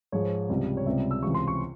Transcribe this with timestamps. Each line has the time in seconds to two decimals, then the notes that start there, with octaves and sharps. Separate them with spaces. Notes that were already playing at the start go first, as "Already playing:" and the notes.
0.12 G#2 F3 G#3 C#5
0.49 C#2 C3 G3
0.77 C#5
0.86 C#2 C3 G3 E5
1.11 E6
1.23 C#2 C3 E3 C#6
1.34 C6
1.48 C#6